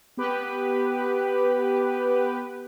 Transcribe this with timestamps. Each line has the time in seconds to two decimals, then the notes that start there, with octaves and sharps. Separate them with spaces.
0.17 B3 G4 B4